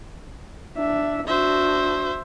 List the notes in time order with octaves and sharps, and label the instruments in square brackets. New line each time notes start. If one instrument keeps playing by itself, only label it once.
[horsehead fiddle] D4 E5
[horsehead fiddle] D4 F#4 [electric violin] C5 E5